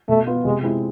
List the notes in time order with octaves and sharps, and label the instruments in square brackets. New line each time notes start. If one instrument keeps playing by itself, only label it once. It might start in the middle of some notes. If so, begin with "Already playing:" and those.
[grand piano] B2 [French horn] A3
[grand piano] B3 F4
[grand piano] C3 [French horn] G#3
[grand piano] G#3 C4 E4